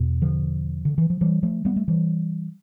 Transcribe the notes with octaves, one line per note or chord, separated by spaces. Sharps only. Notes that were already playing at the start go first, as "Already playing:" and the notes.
Already playing: E2 B2
D3 F3
D3
E3
F3
E3 G3
F3 A3
G3 B3
A3
E3 G3